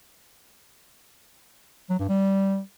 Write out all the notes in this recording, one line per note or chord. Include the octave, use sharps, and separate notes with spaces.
F#3
G2
G3